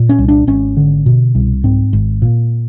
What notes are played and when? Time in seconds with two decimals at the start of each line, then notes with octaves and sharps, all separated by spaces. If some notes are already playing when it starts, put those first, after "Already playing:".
Already playing: A#2
0.09 C#4
0.18 C2
0.28 D4
0.47 G#1 C#4
0.77 D3
1.06 B2
1.35 C2
1.64 G#2 C4
1.93 G#1
2.22 A#2